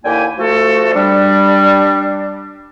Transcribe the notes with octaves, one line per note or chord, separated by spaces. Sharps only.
D#2 D3 A#3 E4 G5 G#5
F3 A3 F#4 A4
G3 D4